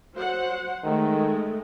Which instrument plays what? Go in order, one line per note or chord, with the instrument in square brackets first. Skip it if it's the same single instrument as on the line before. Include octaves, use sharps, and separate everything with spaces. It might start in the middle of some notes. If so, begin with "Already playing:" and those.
[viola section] F#3 C5 F#5
[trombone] D#3 [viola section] G#3 A3